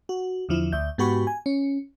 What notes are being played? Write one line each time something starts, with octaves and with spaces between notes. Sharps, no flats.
F#4
E2 D3 F3 E4
D2 E5 G6
G#2 B3 F#4 G4 B5 C#6
G#5
C#4